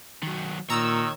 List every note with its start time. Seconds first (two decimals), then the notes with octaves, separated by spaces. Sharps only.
0.23 D#3 F#3
0.70 A#2 D#3 C#5 A#5 E6